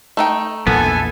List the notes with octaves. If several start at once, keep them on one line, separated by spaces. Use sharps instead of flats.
A3 D#4 G5
A#1 E2 A#2 B3 A4 G#5